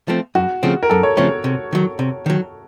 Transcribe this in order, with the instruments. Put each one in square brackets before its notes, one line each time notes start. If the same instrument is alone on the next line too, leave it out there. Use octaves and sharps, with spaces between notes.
[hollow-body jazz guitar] F3 A3 C4
[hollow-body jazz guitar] F#2 [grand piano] F#4
[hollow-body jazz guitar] C#3 F3 A3 C4
[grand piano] A#4
[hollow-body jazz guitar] F#2 [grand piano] A4
[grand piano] C#5
[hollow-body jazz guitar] C#3 F3 A3 C4 [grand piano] C#5
[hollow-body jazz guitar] C3
D#3 F#3
C3
D#3 F#3